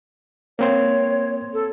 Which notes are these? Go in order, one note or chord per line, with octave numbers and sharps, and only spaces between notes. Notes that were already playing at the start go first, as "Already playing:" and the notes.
A#3 C4 C#5 C6
A4